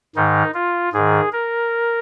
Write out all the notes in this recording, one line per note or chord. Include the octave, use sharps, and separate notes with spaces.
G#2 D#3 D#4
F4
G#2 D#3 G#4
A#4